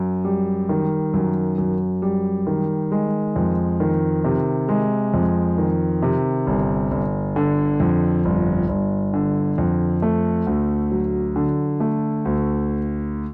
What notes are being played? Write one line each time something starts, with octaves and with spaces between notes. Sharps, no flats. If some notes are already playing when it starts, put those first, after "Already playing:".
Already playing: F#2
G3
D#3
F#2
F#2
G3
D#3
G#3
F2
D#3
C3
G#3
F2
D#3
C3
G1
G1
D3
F2
G1
G1
D3
F2
A3
D2
F#3
D3
A3
D2